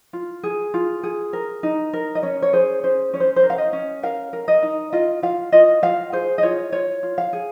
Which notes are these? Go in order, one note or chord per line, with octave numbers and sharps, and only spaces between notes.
F4
G#4
F4
G#4
A#4
D#4
A#4
D#5
C#4 C#5
C#5
G#4 C5
C#4 C5
C#4 C#5
C5
C5
A#4
F5
D#5
C#4
A#4 F5
A#4
D#5
D#4
F4 D#5
F4 F5
F4 D#5
F4 F5
G#4 C5
D#5
F4 C#5
F4 C#5
F4
F5
G#4